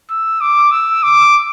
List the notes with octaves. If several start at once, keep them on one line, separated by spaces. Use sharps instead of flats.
E6
D6
E6
D6